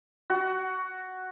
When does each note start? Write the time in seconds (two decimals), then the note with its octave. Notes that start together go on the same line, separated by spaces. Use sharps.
0.30 F#4